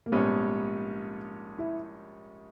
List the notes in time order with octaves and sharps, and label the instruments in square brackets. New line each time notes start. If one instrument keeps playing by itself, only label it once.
[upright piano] A#3
[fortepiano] A#1 G#2 G3 C#4 [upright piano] B3
[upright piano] E4